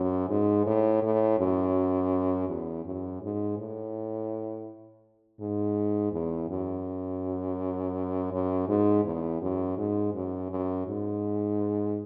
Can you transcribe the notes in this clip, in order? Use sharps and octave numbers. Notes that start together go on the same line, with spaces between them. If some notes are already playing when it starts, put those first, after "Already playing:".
Already playing: F#2
G#2
A2
A2
F#2
E2
F#2
G#2
A2
G#2
E2
F#2
F#2
G#2
E2
F#2
G#2
F#2
F#2
G#2